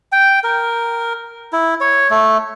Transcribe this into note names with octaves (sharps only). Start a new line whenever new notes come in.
G5
A#4
E4
C#5
A3